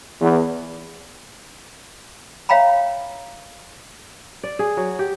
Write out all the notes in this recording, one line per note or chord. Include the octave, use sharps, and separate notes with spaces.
E2
C#5 E5 F5 G5 A#5 B5
D5
G#4
F#3
G4